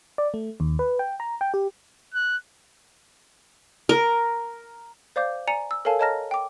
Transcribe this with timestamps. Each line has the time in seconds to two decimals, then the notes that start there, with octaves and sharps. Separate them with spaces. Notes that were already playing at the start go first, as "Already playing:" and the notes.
0.18 D5
0.34 A3
0.60 D#2
0.79 B4
0.99 G5
1.20 A#5
1.41 G5
1.54 G4
2.14 F#6
3.89 A#4
5.16 C5 D5 F5 D6 G6
5.47 D5 G#5 A#5 C#7 F7
5.71 E6
5.85 A4 A#4 C#5 F5 G#5 A5
5.99 C#5 D#5 A5 A#5 F6 A#6
6.31 G5 D6